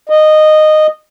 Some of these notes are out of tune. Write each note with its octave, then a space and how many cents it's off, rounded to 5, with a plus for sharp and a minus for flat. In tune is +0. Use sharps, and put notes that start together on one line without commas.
D#5 -15